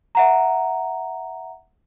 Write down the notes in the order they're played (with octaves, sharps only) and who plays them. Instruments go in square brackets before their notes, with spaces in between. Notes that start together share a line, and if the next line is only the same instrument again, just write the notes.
[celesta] E5 F#5 A#5